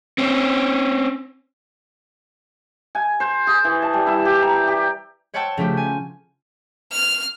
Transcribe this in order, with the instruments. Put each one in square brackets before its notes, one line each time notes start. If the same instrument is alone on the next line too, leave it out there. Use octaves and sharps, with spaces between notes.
[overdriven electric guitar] C4 C#4
[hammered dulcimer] G#5
C5
G#4
E3
A5
G3
E4
G4
A#5
G4
[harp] C5 C#5 F#5 G5 A5 E6
C#3 F3 A3 F4 G4 C5
G#5
[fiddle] F6